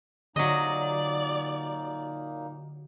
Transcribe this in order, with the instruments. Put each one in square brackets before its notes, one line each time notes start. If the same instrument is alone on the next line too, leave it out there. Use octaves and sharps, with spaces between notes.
[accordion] A#2 A#3 D#4 [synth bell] D3 [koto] F#3 D#5 [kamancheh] D5